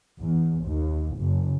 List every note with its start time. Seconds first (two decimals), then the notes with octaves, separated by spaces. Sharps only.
0.19 E2
0.65 D#2
1.18 F#1